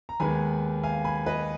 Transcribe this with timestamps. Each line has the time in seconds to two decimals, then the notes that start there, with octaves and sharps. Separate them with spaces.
0.09 A#5
0.20 D#2 D#3 G#3 B3 G#5 B5
0.83 F5 G#5
1.04 G#5 B5
1.26 B4 D#5